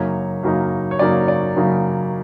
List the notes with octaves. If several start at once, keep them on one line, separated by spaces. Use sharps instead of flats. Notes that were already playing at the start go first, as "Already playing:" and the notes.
Already playing: F#2 C#3 F#3 A#3 D#4 C#5
F#2 C#3 F#3 A#3 D#4
C#5
F#2 C#3 F#3 A#3 D#4 D5
D5
F#2 C#3 F#3 A#3 D#4